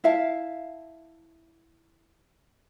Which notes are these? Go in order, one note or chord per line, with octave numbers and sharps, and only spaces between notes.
E4 E5 F5 A5